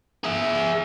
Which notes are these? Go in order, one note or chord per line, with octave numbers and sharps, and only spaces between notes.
G#4 E5